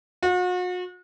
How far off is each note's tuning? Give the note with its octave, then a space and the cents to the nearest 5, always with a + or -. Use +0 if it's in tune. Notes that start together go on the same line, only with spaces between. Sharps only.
F#4 -40